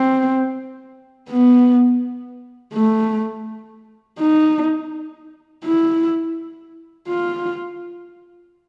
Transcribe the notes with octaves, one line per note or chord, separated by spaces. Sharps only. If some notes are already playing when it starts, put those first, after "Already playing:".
Already playing: C4
B3
A3
D#4
E4
F4